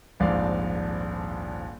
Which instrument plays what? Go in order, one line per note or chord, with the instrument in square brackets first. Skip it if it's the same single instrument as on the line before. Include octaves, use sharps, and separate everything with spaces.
[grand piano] D#1 A#1 F2 G#2 D5 F5